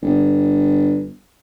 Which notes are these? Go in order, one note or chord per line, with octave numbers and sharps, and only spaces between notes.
G1